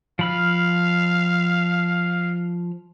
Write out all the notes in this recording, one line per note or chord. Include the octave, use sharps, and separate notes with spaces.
F3 F5 B5 F6